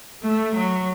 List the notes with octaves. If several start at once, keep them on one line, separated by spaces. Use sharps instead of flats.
A3
F#3